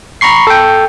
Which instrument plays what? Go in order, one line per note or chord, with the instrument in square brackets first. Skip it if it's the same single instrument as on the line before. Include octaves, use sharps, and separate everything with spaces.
[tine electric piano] A#5 B5 C#6 C7
A4 G5